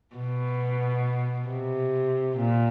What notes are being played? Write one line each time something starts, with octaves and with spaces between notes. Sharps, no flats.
B2
C3
A#2